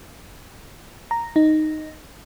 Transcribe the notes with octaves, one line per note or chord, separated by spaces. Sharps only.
A#5
D#4